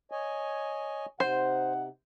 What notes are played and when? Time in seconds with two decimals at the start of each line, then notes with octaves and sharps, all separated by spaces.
0.12 C#5 D#5 G#5
1.20 C3 D#4 C5 F#5